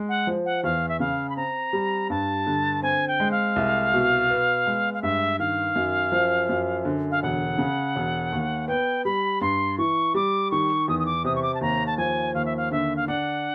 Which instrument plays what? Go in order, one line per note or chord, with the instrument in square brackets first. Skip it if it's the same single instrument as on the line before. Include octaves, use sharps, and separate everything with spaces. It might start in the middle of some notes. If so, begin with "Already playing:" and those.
Already playing: [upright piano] G#3
[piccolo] F#5
[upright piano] F3
[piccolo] F#5
[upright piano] E2 [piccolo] F5
[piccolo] E5
[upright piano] C#3 [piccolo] F5
[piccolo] B5
[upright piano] C4 [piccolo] A#5
[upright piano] G3
[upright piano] G2 [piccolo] A5
[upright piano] D3
[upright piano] C4 [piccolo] G#5
[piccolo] G5
[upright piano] G#3
[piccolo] F5
[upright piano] C2
B2
B3
G#3
[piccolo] F5
[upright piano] G2 [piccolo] E5
[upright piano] D#3 [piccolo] F5
[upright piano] F#2
F3
F#2
D3
[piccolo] F5
[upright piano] E1 [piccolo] F#5
[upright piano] C#3
E1
D#2
[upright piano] B3 [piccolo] G5
[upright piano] G3 [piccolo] B5
[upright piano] G2 [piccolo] C6
[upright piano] E3 [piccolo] C#6
[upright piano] G3 [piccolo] D6
[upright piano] D#3 [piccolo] C#6
[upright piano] E2 [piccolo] D#6
[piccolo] D#6
D6
[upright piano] C3 [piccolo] D#6
[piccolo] C#6
D6
A5
[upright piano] D#2 [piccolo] A#5
[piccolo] A5
[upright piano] F3 [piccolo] G#5
[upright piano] D#2 [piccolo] F5
[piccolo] E5
F5
[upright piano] D3 [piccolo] E5
[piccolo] F5
[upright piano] D4 [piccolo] F#5